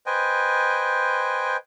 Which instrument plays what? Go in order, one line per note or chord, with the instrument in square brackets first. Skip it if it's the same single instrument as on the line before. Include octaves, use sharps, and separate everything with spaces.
[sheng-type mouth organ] B4 C5 D#5 G5 G#5